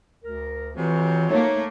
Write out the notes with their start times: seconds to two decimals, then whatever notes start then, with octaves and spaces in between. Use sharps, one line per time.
0.23 D2 A#4
0.76 F2 C3 E3 F#3
1.29 A3 A#3 D#4 C#5